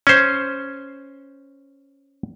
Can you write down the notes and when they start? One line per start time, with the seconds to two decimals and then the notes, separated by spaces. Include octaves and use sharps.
0.07 C#4 C5